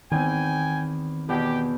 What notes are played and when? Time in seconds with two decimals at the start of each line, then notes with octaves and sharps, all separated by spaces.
0.12 E2 D#3 C4 G5 G#5
1.29 E2 B2 G4